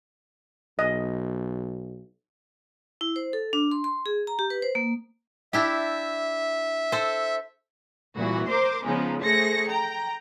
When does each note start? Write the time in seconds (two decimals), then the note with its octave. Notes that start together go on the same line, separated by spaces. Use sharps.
0.79 B1 D#5
3.01 E4
3.16 C5
3.33 A4
3.53 D4
3.71 C6
3.84 C6
4.06 G#4
4.27 A#5
4.39 G4
4.50 B4
4.62 C5
4.75 A#3
5.53 D4 E4 G4 E5
6.92 A4 C5
8.16 C2 A#2 E3 F#4
8.48 A#4 C5 C6 D6
8.85 C#3 F3 G#3 B3 C#4 D#4
9.21 A3 G#4 C5 A#6 C#7
9.68 G5 A#5